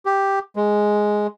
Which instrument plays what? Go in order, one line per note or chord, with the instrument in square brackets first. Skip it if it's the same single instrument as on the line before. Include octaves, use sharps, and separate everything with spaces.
[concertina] G4
G#3